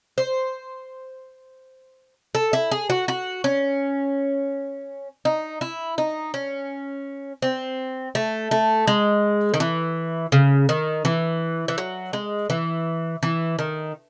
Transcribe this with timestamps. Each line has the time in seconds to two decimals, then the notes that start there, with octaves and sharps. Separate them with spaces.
0.18 C5
2.35 A4
2.53 E4
2.71 G#4
2.90 F#4
3.08 F#4
3.44 C#4
5.25 D#4
5.61 E4
5.98 D#4
6.34 C#4
7.42 C4
8.15 A3
8.51 A3
8.87 G#3
9.54 D#3
9.60 E3
10.32 C#3
10.69 D#3
11.05 E3
11.68 E3
11.78 F#3
12.13 G#3
12.50 E3
13.23 E3
13.59 D#3